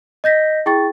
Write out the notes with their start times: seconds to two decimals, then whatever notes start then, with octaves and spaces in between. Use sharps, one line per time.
0.24 D#5 G6 A#6 B6
0.66 E4 G#4 G5 C#6 A6